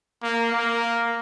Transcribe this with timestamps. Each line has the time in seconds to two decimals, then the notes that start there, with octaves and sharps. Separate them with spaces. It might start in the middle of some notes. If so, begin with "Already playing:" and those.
0.23 A#3
0.52 A#3